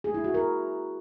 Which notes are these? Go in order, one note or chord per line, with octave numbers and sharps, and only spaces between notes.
G#4
E4
F#4
A#4